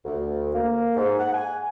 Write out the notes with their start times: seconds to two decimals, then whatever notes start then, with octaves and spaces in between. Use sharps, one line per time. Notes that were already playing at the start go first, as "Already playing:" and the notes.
0.05 D2
0.54 A#3
0.96 G#2
1.20 F#5
1.34 G#5